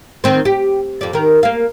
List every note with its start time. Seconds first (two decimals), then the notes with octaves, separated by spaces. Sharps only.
0.24 D#3 C4 C5
0.45 G4
1.01 F2 D5
1.13 D#3 A#4
1.43 A#3 F5